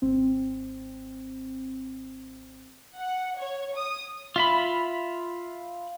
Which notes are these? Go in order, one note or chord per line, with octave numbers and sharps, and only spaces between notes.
G#1 C4
F#5
C#5
D#6
F4 E5 B5